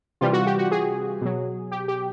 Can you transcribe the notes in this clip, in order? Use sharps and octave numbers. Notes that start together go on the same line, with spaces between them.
C3 E3 G3 F4
F#4
G4
F#4
G#4
B2 F#3
G4
G4